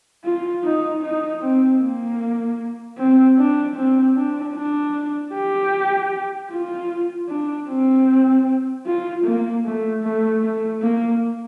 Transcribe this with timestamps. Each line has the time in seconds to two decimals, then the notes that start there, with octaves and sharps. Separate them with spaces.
0.24 F4
0.64 D#4
1.02 D#4
1.41 C4
1.80 A#3
2.98 C4
3.38 D4
3.76 C4
4.16 D4
4.55 D4
5.34 G4
6.50 F4
7.29 D4
7.69 C4
8.86 F4
9.25 A#3
9.65 A3
10.03 A3
10.42 A3
10.82 A#3